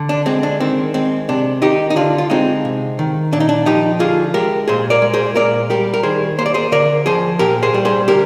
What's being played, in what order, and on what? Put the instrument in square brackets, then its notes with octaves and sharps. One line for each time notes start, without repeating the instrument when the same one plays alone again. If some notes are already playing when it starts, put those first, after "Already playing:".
Already playing: [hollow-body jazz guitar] D3
D4
G#3 C4
D4
D#3 C4
G#3 C4
C3 D4
D#3 D#4 G4
D#4
D3 D4 F4
F4
G#3 C4 D#4
C3
D#3
A#2 D4
D#4
D4
F3 D#4 G4
D3 F4 G#4
G#3 G4 A#4
A#2 G#4 C5
A#4 D5
G#3
G#4 C5
A#2 A#4 D5
G3 G4 A#4
A#4
D#3 G#4 C5
A#3 C5
D5
G#4 C5
D3 A#4 D5
F3 G#4 C5
A#2 G4 A#4
G#4 C5
G3
G#4 C5
D3 G4 A#4